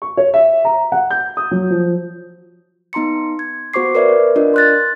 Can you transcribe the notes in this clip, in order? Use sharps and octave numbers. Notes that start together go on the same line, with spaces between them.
C#6
C#5
E5
A#5
F#5
G6
D#6
F#3
F3
B3 D#4 A#5 C6 C#7
G#6
B3 F#4 C5 C#6 D6 C7
A#4 B4 D5 E5
D4 F4 A#4 D5 D#5
C6 F#6 A6